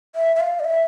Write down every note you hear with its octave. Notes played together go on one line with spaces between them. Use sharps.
E5
E5
F5
D5
E5